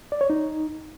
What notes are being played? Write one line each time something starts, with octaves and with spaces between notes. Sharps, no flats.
D5
C#5
D#4